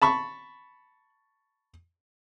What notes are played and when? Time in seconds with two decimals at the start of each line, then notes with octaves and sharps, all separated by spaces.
0.02 A5 B5 C#6